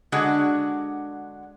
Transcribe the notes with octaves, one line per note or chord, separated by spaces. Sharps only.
D3 G#3 D4 F#4